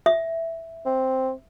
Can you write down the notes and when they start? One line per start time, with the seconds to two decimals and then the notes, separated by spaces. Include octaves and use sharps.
0.06 E5
0.85 C4